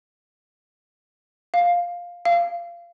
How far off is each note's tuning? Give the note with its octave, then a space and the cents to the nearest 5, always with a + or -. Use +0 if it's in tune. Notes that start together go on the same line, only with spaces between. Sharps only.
F5 +5
F5 -20